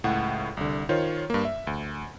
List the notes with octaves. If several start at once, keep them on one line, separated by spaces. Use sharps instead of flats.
C#2 A2 F#5
C2 D3
D#3 F4 C5 C#5
G2 A#3
E5
D2